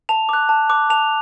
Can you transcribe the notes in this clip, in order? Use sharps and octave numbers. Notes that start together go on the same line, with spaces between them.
A5 F7
D6 F#6
A5
D6 F#6
A5 F7